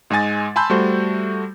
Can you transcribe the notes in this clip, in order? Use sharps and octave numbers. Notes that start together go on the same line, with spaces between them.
G#2 G#3 D#5 G#5 A6
G#5 A5 B5 C6 E6 G6
G3 A3 F#4 C5